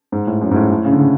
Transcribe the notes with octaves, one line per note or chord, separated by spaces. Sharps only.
G#2
A2
F#2
G#2
A2
A2
C#3
D3
C#3